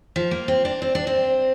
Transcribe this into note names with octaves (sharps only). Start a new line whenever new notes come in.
F3
A#3
C4
D4
C4
D4
C4